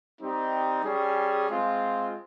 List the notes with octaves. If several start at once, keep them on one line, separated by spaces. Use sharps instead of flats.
G3 C4 D#4 G4
G3 C#4 G#4
G#3 C4 F4